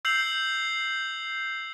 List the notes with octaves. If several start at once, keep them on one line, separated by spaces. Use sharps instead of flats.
E6 G6 C7 F7 F#7